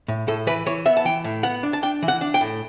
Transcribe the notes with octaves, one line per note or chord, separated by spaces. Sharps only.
A2
A2 A4
E3 B4
E3 C#5
B3 E5
A5
E3 G5
A2
B3 F#5
D4
A5
D4 G5
E3
F#5
D4
G5
A2